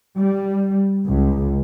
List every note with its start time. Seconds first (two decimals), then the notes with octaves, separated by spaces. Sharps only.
0.17 G3
1.07 C#2